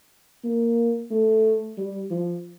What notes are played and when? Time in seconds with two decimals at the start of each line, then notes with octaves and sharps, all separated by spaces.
0.44 A#3
1.11 A3
1.78 G3
2.10 F3